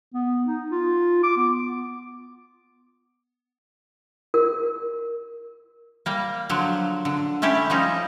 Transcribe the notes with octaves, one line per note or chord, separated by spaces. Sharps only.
B3
D#4
F4
D6
B3
A#4
G3 A#3
D3 F3 F#3
D3
A3 C#4 E4 G4
F3 G3 C#4 D#4